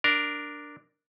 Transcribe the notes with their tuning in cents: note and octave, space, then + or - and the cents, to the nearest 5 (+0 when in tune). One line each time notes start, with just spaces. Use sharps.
D4 +0 A#4 +0